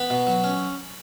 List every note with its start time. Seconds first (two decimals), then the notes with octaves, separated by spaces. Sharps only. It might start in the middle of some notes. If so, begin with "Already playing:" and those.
Already playing: B3 B5
0.10 B2
0.27 F#3
0.44 C#4